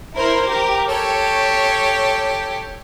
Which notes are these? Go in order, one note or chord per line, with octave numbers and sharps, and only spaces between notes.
E4 A#4 C5
G4 A#4
G4 A4 C#5